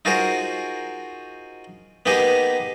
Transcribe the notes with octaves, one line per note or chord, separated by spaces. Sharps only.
D#4 F4 F#4 G#4 A#4 C5
A#3 B3 D#4 G4 G#4 D#5